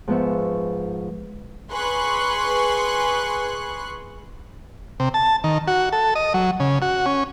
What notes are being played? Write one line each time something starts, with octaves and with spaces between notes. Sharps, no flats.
G#2 F3 B3 E5 C#6
G#4 B4 C6 C#6 F#6
C3
A5
D#3
F#4
A4
D#5
F#3
C#3
F#4
C#4